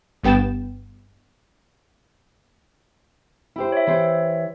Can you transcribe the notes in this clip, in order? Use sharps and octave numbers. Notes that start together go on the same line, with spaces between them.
G1 G2 B3 G5 A6 E7
E4 G4 C5
C#5 E5
E3 G4 C5